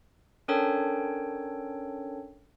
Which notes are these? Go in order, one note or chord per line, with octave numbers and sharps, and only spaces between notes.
C#4 D4 A4 A#4 C#5 G5